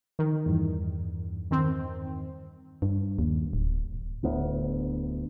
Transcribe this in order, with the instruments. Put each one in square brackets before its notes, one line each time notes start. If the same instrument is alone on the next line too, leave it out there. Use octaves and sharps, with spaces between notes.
[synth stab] D#3
[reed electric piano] E2 G2
[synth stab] D#3 C4
[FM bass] G2
D#2
D1
[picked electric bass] D1 D2 B3